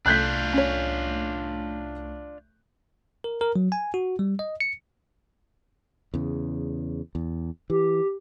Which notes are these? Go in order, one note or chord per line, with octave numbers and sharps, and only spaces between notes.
C2 A3 D4 F4 F#6 G6 B6
C#4 C#5
A#4
A#4
F#3
G#5
F#4
G3
D#5
C#7
E2 C#3
E2
E3 G4